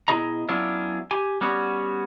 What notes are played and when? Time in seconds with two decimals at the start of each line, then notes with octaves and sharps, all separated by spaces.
0.08 B2 G3 E4 G#4 D#5 A#5
0.49 F#3 B3 C#4 D4 E4 F4
1.11 G4 G#5
1.41 G3 B3 C#4 F#4